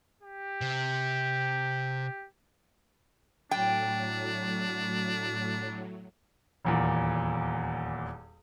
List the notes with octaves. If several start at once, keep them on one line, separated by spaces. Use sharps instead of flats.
G4
C3
A2 F#3 D4 G5
D#1 E2 A#2